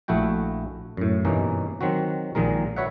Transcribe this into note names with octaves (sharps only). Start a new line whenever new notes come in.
A#1 A3 E4 F#4 G5
F#2 A2
G2 B2 E3 A#3 C#4 D#4
D#3 F#3 C4 F#4
A#1 A#2 D#3 G#3 A#4
F#4 B4 C#5 E5 F#5